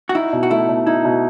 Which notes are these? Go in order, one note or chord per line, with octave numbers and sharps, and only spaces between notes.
F#4
D#4 E4
B2
F#4
A3 E4
B2
D#4 E4
B2